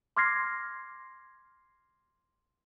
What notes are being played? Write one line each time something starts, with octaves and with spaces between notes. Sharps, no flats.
C6 D6 F6 G#6 A#6 C7